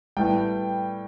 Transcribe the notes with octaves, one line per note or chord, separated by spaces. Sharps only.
A2 G3 B3 G5